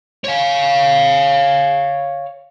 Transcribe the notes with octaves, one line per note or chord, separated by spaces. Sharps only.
C#5 F5